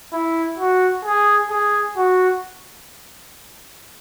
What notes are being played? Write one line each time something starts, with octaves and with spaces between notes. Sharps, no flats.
E4
F#4
G#4
G#4
F#4